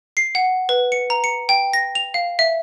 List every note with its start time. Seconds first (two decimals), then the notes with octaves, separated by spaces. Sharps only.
0.17 C7
0.35 F#5
0.69 B4
0.92 C#7
1.10 A#5
1.24 C#7
1.49 G5
1.73 A#6
1.95 F7
2.14 F5
2.39 E5